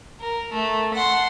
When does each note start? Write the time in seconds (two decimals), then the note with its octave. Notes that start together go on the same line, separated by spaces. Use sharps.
0.21 A#4
0.53 A3
0.94 F#5 C6